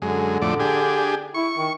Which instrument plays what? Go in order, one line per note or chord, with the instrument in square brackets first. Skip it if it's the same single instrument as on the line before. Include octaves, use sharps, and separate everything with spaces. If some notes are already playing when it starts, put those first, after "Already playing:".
[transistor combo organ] F#2 G#3 [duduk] D3
[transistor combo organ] F2 A2 D5
D4 G4 G#4
[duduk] E4 [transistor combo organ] C#6
[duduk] D#3